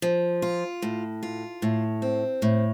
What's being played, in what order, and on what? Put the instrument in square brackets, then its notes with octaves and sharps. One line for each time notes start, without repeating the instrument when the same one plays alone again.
[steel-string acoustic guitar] F3
F4
A2
F4
A2
C4
A2